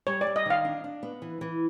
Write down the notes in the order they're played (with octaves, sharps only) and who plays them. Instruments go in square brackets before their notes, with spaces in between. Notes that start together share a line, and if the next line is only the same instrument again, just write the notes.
[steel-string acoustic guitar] G3 [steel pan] C#5
[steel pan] D5
[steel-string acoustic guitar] G3
[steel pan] D#5
[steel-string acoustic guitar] D#3 [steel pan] F5
[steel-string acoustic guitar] D4
D4
B3
E3
E3